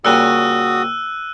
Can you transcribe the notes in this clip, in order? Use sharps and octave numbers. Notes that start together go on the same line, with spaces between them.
A#2 C#3 G3 F#4 D#6 E6 F#6 D#7